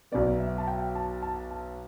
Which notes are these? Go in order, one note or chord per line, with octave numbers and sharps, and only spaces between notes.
B1 B2 B3 D5
E5
A5
G5
A5
A5
A5